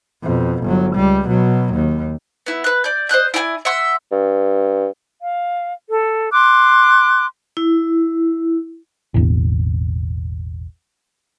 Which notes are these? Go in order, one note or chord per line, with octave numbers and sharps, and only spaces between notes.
F2 B2
G1 F#3
C#2 G3
B2 F#3
D#2
B3 E4
B4 F#6
D5 G6
C5 D#5 F#6 G6
E4 D5 G5 G#5
E5 F#5 C6
G2
F5
A4
C6 D6 F#6
E4
E1 A1